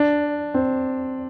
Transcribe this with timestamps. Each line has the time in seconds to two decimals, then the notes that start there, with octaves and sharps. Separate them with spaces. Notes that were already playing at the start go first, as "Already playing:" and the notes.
Already playing: D4
0.54 C4